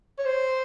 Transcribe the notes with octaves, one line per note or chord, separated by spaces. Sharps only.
C#5
C5